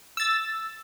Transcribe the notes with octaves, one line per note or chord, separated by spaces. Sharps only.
E6 A6